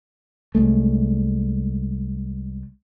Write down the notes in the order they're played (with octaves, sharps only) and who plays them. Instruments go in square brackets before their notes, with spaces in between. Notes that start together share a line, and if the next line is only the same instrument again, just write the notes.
[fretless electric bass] C2 G#3 A3